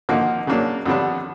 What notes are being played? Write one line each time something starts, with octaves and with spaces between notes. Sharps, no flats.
D3 F3 A#3 D#4 F#4
C#3 F#3 A#3 D4
F2 D3 G3 B3 D4